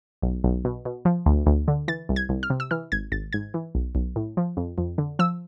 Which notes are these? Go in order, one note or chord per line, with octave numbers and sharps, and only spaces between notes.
B1
B1
B2
B2
F3
D2
D2
D3
E3 A6
C2
G#6
C2
F6
C3
E6
E3 F6
G#1 G#6
G#1 A6
G#2 G#6
E3
B1
B1
A2
F3
F2
F2
D3
F3 E6